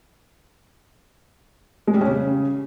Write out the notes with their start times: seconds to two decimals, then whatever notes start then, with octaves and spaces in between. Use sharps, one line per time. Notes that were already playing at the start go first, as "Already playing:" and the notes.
1.87 G#3
1.94 G3
2.01 C#4
2.08 C#3